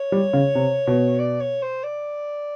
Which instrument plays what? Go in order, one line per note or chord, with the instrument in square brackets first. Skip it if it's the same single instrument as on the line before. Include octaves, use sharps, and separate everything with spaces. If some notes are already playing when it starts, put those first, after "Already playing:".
Already playing: [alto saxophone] C#5
[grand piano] G3
C#3
C3
B2
[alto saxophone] D5
C#5
C5
D5